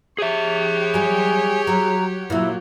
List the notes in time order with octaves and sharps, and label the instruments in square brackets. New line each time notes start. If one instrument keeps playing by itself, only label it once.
[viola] G4 C#5 [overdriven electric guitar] G#4 E5
[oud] F#3 G3 [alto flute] G#5
[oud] F#3 [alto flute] A#5
[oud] A#2 F#3 [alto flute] E4